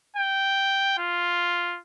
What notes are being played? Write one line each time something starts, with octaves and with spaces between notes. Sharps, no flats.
G5
F4